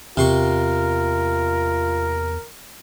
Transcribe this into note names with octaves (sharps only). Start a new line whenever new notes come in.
E2 C3 F4 A#4 C6 C#6